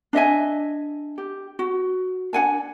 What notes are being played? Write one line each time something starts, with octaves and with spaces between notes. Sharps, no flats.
D4 D#5 E5 G#5
G4
F#4
D4 F#5 G#5 A5